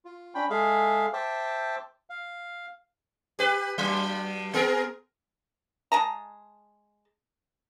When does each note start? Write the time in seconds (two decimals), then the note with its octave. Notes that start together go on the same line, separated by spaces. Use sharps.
0.05 F4
0.35 C#4 D4 G5 B5
0.50 G#3 G#4 A4 E5 F5
1.13 C5 E5 G5 A5 D6
2.10 F5
3.39 G4 B4
3.78 G2 F#3
4.54 B3 G#4 A#4
5.92 G#3 A5 A#5